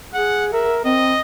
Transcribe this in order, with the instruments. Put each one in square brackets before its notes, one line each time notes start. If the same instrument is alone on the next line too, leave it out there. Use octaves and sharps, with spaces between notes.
[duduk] G#4 [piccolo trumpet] F#5
[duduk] A#4 [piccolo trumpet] E5
[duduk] C4 [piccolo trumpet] D#5